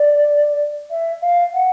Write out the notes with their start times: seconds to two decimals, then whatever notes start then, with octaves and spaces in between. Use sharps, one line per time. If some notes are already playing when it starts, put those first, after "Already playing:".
Already playing: D5
0.90 E5
1.22 F5
1.53 F#5